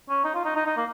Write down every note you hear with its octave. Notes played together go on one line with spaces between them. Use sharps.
C#4
D#4
F4
D#4
D#4
D#4
A#3